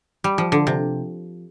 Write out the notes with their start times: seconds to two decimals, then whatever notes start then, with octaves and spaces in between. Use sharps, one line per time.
0.24 G3
0.38 F3
0.52 D3
0.67 C3